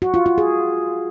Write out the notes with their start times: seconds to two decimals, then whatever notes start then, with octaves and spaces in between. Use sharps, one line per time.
0.02 F#4
0.14 F4
0.26 F4
0.38 G#4